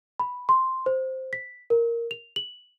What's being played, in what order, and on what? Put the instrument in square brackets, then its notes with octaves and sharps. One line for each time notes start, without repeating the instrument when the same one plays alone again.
[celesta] B5
C6
C5
B6
A#4
F7
F#7